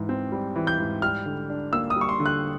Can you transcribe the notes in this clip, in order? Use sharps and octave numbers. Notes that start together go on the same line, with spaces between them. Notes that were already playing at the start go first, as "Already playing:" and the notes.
Already playing: G#2 E3
C4
G3
E3
G6
G#2
G3 F6
D3
D4
A#3 E6
D#6
G3
C#6
C6
D3
F#6